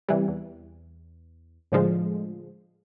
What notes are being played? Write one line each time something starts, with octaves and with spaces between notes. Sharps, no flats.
C3 E3 G3
E2
A2 D3 F3 G#3